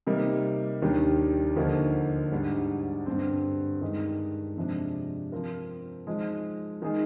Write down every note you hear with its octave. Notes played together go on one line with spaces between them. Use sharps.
C3 G3 A#3 D#4
D#2 D#3 G3 D4 G4
D2 D3 F3 A#3 D#4
G#2 G3 D4
G2 D3 G3 C4
G2 D#3 G#3 D#4
F2 C3 F3 G#3 D4
F3 C4 F4 A#4
F3 G#3 D#4
D#3 G#3 D#4 G#4